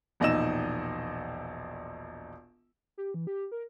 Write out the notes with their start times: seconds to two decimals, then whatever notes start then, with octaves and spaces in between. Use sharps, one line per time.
0.20 E1 A#1 D#4 D#5 E6 E7
2.98 G4
3.14 E3
3.27 G4
3.52 A#4